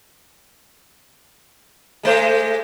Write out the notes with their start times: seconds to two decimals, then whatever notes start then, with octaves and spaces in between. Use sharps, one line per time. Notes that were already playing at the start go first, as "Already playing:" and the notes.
2.03 G#3 A3 C5